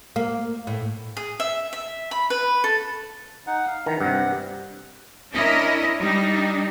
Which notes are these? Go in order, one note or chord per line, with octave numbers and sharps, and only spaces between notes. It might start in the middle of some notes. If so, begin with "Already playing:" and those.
A#3
A2
G#4
E5
E5
B5
B4
A4
D#4 F#5
F5
D#3 E3 A#5
G2 C3 F#5
C#4 D4 E4 A#4 D#5
G3 D4 D#4